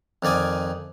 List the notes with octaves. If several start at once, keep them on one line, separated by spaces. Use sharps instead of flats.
F2 D#3 D5 G#5 D#6